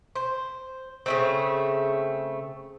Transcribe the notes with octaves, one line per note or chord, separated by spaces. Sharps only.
C5
C#3 A3 C4